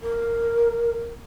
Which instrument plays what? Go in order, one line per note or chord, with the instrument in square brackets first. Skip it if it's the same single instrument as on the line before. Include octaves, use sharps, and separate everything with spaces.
[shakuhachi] A#4